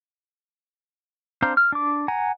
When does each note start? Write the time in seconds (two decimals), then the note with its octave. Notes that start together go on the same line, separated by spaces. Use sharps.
1.42 C4 D4 C5 F5 A#5
1.57 F6
1.72 D4 D6
2.08 F#5 G#5 A#5